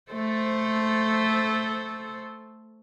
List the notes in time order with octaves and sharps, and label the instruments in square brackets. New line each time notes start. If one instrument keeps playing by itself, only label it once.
[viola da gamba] A3 A4 C5